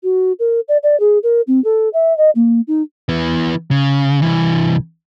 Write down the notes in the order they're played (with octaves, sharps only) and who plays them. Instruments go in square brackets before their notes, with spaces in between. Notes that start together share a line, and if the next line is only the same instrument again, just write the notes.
[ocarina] F#4
A#4
D5
D5
G#4
A#4
C4
A4
E5
D#5
A#3
D#4
[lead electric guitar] E3 B3
C#3
C2 E3